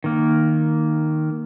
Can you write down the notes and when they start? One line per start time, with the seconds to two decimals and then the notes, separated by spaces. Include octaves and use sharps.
0.04 D#3 A#3